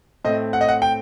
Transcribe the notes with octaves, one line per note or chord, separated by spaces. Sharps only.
A2 A3 C4 D#5
F#5
D#5
F#5
G5